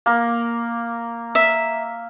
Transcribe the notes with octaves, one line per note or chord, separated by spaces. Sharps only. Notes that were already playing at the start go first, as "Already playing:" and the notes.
A#3 A#4
E5